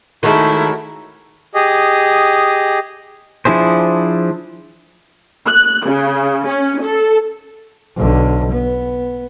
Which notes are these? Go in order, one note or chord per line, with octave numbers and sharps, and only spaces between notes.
D#3 G#3 A3 E4 F#4 A#4 C#5
G4 G#4 D#5
F3 D4 E4 G#4 C5
F#6
C#3
C#4
A4
B1 D3
B3